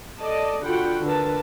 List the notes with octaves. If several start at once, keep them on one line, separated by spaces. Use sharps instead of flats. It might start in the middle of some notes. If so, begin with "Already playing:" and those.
A4 D5 D#5 A5
D3 F4 F#4 F#5 G5 B5
D3 A#4 B4 A5